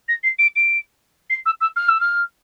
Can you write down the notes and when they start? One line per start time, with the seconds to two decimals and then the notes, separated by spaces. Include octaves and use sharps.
0.08 A#6
0.23 C7
0.39 D7
0.56 D7
1.30 C7
1.46 E6
1.61 E6
1.76 F6
1.88 E6
2.00 F6